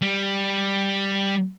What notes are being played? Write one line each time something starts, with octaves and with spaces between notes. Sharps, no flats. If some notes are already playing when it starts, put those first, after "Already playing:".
G3